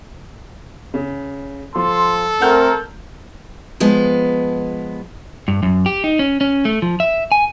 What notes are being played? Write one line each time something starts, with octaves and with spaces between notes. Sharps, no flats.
C#3
F3 A4 C6
A3 C4 A#4 F#5 F6 G6
F3 G#3 B3
G2
F#2
G4
D#4
C#4
C#4
A3
F3
E5
G#5